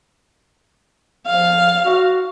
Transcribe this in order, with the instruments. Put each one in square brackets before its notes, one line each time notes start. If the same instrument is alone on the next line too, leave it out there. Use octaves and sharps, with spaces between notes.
[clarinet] F3 [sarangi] F5
[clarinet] F#4